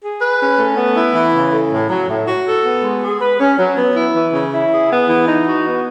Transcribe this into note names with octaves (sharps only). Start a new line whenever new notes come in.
G#4
B4
C#4
A3
B3
E4
E3
C#3
A3
A2
F#3
A2
F#4
A4
B3
G#3
G#4
B4
C#4
F#3
B3
E4
E3
C#3
E4
G#4
B3
E3
D#4
F#4
B3